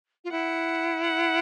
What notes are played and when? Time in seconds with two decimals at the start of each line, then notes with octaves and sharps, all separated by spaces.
0.24 F4
0.31 E4 F#5
1.03 F#5